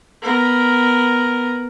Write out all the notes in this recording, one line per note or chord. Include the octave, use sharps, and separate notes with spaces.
B3 A#4